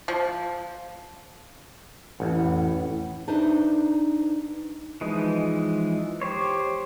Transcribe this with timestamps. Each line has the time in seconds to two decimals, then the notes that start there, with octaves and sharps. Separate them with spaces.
0.08 F3
2.20 A1 F2 E3 E4 F#5
3.28 D4 D#4 B4 C5 E5
5.01 E3 F3 G#3 D#4
6.22 G4 C5 C#5